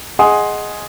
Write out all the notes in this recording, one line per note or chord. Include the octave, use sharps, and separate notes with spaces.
G#4 D#5 F#5 G#5 C6 D#6